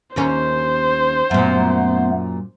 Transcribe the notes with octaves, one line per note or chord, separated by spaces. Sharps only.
D#2 A#3 C#4 C5
F#2 A#2 A3 B3